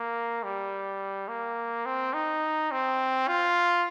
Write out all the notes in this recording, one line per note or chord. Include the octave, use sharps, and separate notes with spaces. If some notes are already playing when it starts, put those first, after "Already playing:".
Already playing: A#3
G3
A#3
C4
D#4
C4
F4